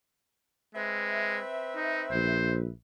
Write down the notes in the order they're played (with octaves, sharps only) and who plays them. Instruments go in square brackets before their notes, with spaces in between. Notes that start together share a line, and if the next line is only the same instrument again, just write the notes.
[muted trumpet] G#3 [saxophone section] C4 B4 E5
[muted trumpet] D#4
[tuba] A#1 [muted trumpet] C5